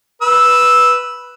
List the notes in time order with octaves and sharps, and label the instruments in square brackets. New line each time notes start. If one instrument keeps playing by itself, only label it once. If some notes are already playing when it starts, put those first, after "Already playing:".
[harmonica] B4 E6